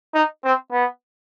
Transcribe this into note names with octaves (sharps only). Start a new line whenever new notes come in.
D#4
C4
B3